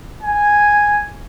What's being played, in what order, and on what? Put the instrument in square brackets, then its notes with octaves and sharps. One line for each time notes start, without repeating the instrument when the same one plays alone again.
[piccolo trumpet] G#5